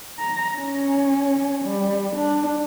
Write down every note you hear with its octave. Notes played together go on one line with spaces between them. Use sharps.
A#5
C#4
G3
D4